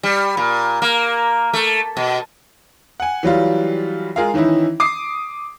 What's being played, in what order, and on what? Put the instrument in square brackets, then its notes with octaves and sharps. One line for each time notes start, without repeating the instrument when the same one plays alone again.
[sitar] G3
A#2
A#3
A3
B2
[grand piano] F#5 G#5
E3 F#3 G3 F4
G#3 F4 G#4 A#4 F5
D#3 E3 C#4 D#4 E4
D6 D#6 C7 D7